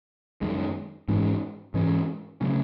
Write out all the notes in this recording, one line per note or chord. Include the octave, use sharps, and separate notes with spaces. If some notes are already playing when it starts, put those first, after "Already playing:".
F#2 D#3 G#3
G#2 E3 G#3 C#4
G#2 E3 G#3 C#4
C#3 F#3 A3 C#4